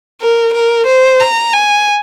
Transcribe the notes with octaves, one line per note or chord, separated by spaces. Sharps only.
A#4
A#4
C5
A#5
G#5